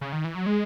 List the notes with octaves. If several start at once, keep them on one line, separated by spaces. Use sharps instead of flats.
C#3
D#3
E3
F#3
G#3